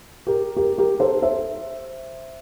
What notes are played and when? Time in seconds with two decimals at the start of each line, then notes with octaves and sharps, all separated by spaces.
0.27 G4 A#4
0.57 G4 A#4
0.78 G4 A#4
1.00 A4 C5
1.22 C5 E5